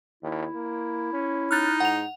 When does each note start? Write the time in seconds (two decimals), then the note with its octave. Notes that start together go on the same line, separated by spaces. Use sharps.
0.23 D#2 E4
0.55 A#3
1.13 C#4
1.51 D#4 F6 F#6 A6
1.80 G#2 F#5 F7